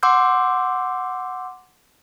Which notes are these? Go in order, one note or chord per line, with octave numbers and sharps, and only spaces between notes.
F#5 C6 D6 E6 G6